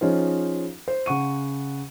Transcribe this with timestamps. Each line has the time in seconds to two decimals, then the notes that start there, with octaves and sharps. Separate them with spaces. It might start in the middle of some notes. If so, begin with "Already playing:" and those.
0.01 F3 C#4 D#4 F4 G#4 C5
0.88 C5
1.06 C#3 F#5 C#6 D#7